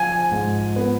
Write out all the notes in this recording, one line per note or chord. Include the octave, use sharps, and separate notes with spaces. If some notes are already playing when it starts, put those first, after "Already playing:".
Already playing: F3 G#5
G#2
B3